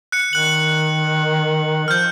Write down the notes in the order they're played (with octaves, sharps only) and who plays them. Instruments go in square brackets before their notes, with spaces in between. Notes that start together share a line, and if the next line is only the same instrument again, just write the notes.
[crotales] F#6 C#7
[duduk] D#3 [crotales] F#6 F#7
[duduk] F3 [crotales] F6 G6